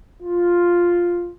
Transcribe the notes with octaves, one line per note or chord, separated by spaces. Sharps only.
F4